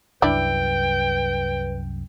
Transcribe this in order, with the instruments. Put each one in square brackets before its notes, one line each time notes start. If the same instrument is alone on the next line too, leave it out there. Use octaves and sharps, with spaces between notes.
[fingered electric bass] C2 F#2 [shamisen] D4 E4 D5 [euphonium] B4 [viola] G5